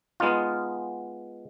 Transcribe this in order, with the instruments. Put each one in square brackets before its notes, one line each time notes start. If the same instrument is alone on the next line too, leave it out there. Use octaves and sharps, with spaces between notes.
[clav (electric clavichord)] G#3 B3 D#4 F4